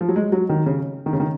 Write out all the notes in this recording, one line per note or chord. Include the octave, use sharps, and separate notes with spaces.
F3
F#3
G#3
F#3
D#3
C#3
D#3
C#3
D#3